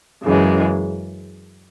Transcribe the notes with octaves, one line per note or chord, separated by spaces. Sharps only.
F#2 C#3 E3 G#3